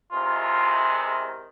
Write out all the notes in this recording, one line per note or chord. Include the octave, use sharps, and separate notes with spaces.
E2 C3 D#3 G#3 F4